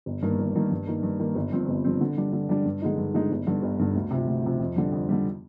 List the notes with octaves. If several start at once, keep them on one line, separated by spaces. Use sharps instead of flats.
G1
G2 D#3 A#3
G1
G2 D#3 A#3
G2
D#3 A#3
G2
D#3 A#3
G1
G2 F3 C4
G1
G2 F3 C4
D3
G3 D4
D3
G3 D4
G2
D3 G#3 D#4
G2
D3 G#3 D#4
G1
G2 D3
G1
G2 D3
D2
C3 F3
D2
C3 F3
F2
D3 G3
F2
D3 G3